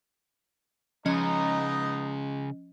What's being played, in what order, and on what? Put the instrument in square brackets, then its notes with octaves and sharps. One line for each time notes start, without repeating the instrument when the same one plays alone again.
[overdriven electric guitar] C#3 G#3 [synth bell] F3 C#4 D#5 [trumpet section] B3 D#4